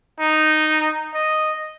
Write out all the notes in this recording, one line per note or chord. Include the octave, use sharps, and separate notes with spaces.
D#4
D#5